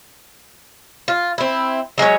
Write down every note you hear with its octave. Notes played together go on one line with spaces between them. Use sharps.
F4
C4 E4
F#3 G#3 C#4 C#5